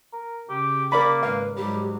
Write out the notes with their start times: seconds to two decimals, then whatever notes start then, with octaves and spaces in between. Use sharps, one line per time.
0.13 A#4
0.49 C#3 G4
0.92 A#3 A#4 D5 B5 D6
1.23 G#1 B4 F5
1.57 G#2 F#3 G3 G4